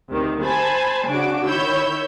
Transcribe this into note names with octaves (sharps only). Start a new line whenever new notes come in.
D2 C3 D#3
C5 G#5 A5 B5
C#3 D4 F#4 D6
D#3 E4 C#5 B5 E6 G6